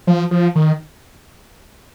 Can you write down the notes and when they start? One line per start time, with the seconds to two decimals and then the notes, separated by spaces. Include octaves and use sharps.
0.07 F3
0.31 F3
0.55 D#3